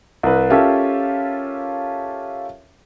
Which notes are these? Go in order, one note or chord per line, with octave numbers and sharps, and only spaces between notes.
C2 B4
C#4 F4 G4 A4 A#4 E5